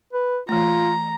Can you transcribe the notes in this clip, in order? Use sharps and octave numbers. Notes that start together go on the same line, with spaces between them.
B4
E3 A3 F4 A#5